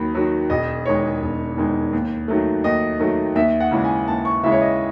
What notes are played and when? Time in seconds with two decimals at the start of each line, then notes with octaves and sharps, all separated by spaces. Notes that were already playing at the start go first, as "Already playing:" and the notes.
Already playing: D#2 D#3 F#3 B5
0.15 D#3 F#3
0.50 E1 D#5
0.85 E2 D#3 G#3 C#5
1.22 E1
1.57 E2 D#3 G#3
1.93 D#2
2.28 D#3 F#3 A3
2.64 D#2 D#5
3.00 D#3 F#3 A3
3.35 D#2 E5
3.60 F#5
3.71 C#3 E3 G#3
3.84 G#5
4.07 D#2 A5
4.25 C#6
4.43 C#3 E3 G#3 E5
4.52 C#5
4.61 D#5